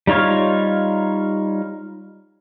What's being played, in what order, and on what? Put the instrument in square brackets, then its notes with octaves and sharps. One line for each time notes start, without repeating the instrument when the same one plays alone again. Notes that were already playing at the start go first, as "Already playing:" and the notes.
[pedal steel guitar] G3 D#4 F4 C#5 F5